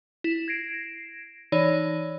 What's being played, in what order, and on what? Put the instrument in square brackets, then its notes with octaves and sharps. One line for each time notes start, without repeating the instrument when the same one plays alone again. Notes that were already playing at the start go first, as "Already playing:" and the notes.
[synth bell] E4
G#6 A#6 C7 D7 E7
E3 D#4 C#5 D5